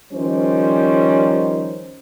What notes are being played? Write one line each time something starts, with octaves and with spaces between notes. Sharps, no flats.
D#3 F3 G3 C#4 C5